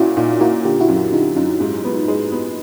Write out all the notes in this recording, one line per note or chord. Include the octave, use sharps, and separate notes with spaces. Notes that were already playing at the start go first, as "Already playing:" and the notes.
Already playing: A#2 C#4 E4 F#4
A#2 D#4 F4
A#3 E4 F#4
D3 F4 G4
E4 F#4
F#2
E4 F#4
D3 D#4 F4
F#2 D#4 F4
G#2
B3
G#3
B3